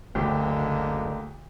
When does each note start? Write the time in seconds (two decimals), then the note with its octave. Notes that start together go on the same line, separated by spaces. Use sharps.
0.15 F#1 D2 D3 G#3 A#3 G4